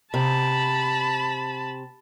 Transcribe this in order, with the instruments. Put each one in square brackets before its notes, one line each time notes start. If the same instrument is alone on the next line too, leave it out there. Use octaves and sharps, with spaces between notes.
[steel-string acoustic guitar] C3 [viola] A5 B5